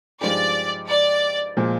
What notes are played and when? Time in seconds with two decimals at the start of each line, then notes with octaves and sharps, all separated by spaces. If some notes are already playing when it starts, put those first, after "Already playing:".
0.21 G2 F3 G#3 D#4 G4 D5
0.89 D5
1.57 A#2 F3 G#3